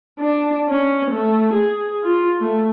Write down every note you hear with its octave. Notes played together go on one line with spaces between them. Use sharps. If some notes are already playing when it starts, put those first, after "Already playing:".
D4
C#4
A3
G#4
F4
A3